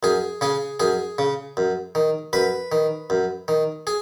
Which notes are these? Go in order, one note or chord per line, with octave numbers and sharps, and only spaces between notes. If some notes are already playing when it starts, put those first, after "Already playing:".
F#2 G#4
C#3 G#4
F#2 G#4
C#3
F#2
D#3
F#2 B4
D#3
F#2
D#3
G#4